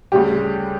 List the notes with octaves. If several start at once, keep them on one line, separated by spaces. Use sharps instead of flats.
D2 C#3 G3 G4